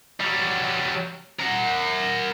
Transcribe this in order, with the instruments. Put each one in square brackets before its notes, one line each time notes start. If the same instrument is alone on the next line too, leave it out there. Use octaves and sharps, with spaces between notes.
[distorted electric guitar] F#3 G3
A#4 F#5